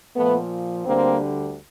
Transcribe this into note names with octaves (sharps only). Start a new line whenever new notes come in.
A#2 F3 A3 B3
D2 D3 G3 A#3 C4